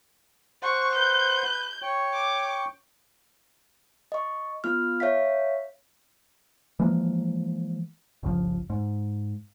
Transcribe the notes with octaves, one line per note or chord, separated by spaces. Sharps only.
C5 F#5 C#6
B4 G6
C#5 G5 C#6
D6
D#5 C#6
B3 F4 F6
C#5 E5 F5 B6
E3 F3 G#3 A#3
G1 C#2 A#2 F3
G#2